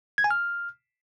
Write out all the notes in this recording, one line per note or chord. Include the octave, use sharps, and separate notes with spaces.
G#6
G#5
F6